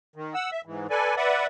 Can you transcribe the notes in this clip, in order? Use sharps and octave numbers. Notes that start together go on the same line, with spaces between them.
D#3
F#5 E6
E5
G#2 E3
A4 B4 D5 G#5
B4 D5 E5 F#5